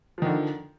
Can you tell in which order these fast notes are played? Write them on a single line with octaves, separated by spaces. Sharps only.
F3 D#3 D3